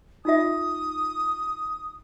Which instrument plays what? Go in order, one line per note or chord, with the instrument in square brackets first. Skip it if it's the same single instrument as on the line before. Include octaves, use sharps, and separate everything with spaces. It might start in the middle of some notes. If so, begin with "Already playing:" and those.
[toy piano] D#4 F4 E5 [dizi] D#6